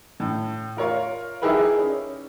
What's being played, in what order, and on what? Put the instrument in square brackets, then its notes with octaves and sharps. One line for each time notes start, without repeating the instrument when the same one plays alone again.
[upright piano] A2
F4 A#4 C#5 F5
D#4 E4 G4 G#4 A#4 B4
C#4